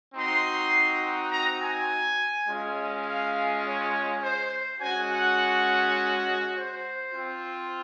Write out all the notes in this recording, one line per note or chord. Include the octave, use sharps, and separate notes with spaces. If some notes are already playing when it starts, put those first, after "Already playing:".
C4 D#4 F#4 C6
A#5
G#5
G#3 C#4 F4
F5
C#5
C5
G#3 C#4 F#4 G#5
F#5
C5
C4 F4